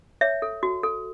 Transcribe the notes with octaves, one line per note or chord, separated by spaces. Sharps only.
C#5 E5
A4
F#4
A4